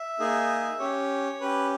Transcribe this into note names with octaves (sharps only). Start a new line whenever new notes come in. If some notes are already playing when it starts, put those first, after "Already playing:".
Already playing: E5
A#3 D#4 G#4
C#4 G4 C#5
C#4 G4 B4